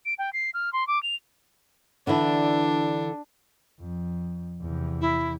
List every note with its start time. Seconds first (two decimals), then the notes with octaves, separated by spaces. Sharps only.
0.06 D7
0.19 G5
0.33 C7
0.54 F6
0.73 C6
0.88 D6
1.03 F7
2.07 D3 E3 D4 E4
3.80 F2
4.61 E2 C3
5.00 E4